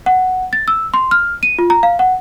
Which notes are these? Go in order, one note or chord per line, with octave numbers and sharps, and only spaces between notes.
F#5
A6
E6
C6
F6
D#7
F4
A#5
F5
F#5